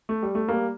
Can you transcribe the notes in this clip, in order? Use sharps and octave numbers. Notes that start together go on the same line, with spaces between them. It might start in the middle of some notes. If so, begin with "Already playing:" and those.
A3
G3
A3
G3 A#3